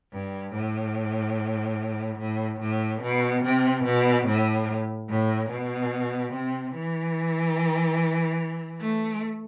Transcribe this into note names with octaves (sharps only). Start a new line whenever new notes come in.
G2
A2
A2
A2
B2
C3
B2
A2
A2
B2
C3
E3
A3